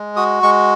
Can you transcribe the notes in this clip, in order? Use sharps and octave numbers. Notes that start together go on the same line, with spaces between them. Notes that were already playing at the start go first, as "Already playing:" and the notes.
Already playing: G#3
F#4 D#6
G#3 C#6